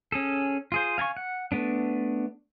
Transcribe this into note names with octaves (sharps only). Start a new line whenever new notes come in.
C#4 G#4 A4
F4 G#4 C5
F5 G#5 A5 C#6
F#5
A3 B3 D4